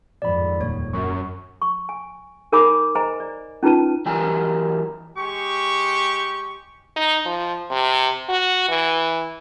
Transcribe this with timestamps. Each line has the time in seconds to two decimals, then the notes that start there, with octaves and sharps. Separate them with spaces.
0.22 F2 G#2 D#3 D5 B5
0.61 D#1 C#5
0.93 F#2 C#6
1.62 C#6
1.89 G#5
2.52 D#4 A#4 C#5 G#5 B5 D6
2.95 C5 D#5 G#5 A#5
3.20 D5
3.63 C#4 D#4 F4 B4 A5
4.06 E3 F#3 G4 A#4 G#5
5.17 G#3 G4 C#6
6.96 D#4
7.25 F3
7.71 C3
8.29 F#4
8.69 E3